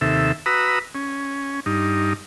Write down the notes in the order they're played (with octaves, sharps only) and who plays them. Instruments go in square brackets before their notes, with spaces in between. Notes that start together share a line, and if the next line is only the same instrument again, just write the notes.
[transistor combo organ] D#2 C3 A4 E5
F#4 B4 A#5 B5 D#6 E6
C#4
G2 D#4